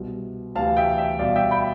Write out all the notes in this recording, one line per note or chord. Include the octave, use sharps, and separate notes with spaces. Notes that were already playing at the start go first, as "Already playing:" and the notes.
Already playing: C2 B2
D2 C3 E3 F5 A5
E5 G5
E5
C2 B2 D5 F5
E5 G5
G5 B5